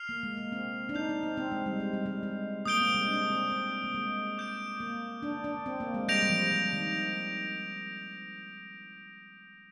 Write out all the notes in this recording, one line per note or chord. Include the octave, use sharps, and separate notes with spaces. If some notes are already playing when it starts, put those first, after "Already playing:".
Already playing: F6 C7 F7
A#3
G#3
A#3
C4
D4
D#4 G6 C7 F7
D#4
C4
C4
G#3
G3
G#3
G3
G#3
G#3
A#3 D#6 G6 D7 G7
C4
G3
G#3
D4
C4
C4
A#3
G#3
D6 G6 D7
A#3
D4
D4
C4
A#3
G#3
G3 G6 A#6 D7 F7
G3
F3
F3
D#3